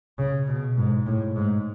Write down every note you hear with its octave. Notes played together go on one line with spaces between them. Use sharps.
C#3
B2
G#2
A2
G#2